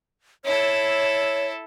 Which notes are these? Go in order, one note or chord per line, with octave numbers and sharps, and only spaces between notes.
E4 A4 C#5